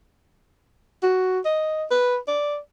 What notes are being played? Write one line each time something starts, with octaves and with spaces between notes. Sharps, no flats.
F#4
D#5
B4
D5